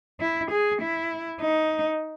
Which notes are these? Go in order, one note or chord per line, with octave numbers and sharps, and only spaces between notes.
E4
G#4
E4
D#4